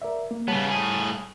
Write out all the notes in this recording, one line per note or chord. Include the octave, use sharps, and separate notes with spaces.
A#4 D5 E5
A#3
C#3 G3 B3 C#5 A5
A2 G#4